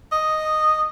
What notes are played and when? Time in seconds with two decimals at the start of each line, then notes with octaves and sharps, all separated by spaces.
0.12 D#5